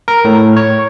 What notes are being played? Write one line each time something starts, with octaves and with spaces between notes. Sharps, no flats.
A#4
A2
C#5